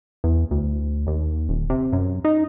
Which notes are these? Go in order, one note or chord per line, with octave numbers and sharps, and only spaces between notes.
E2
D2
D#2
D#1
C3
F#2
D#4